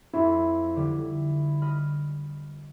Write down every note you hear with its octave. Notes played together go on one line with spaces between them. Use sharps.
F2 E4
D3 G3
D#5 B5 F6